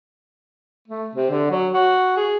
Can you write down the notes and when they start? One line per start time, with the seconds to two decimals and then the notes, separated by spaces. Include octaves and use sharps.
0.88 A3
1.15 C3
1.30 D3
1.50 F#3
1.74 F#4
2.17 G#4